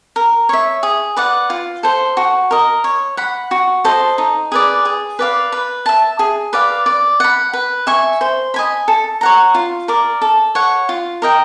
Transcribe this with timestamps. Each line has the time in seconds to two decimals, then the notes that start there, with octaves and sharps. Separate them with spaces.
0.16 A#4
0.49 C#5 E5
0.83 G#4
1.17 B4 D5 F#5
1.50 F4
1.83 A4 C5
2.17 F#4
2.51 A#4 D#5
2.84 C#5
3.17 F#5 B5
3.51 F#4
3.85 A4 C5 D#5
4.18 D#4
4.52 G#4 B4 D5
4.85 G#4
5.19 B4 D5 F5
5.52 B4
5.86 E5 A5
6.19 G#4
6.53 B4 D5 F5
6.86 D5
7.20 F#5 B5
7.53 B4
7.87 E5 G#5 C#6
8.21 C5
8.54 D#5 G#5 B5
8.88 A4
9.21 C#5 F#5 A#5
9.55 F4
9.88 A#4 D5
10.21 A4
10.55 C#5 F#5
10.89 F4
11.22 A#4 D#5 G5